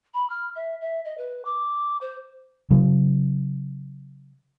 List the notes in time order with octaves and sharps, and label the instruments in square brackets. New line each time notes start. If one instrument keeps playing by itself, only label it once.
[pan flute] B5
F6
E5
E5
D#5
B4
D6
C5
[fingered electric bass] C#3 F#3